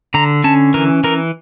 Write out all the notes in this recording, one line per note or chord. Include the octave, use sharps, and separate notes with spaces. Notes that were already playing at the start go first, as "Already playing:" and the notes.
D3 A#5
C#4 A5
E3 A#4
E3 A#4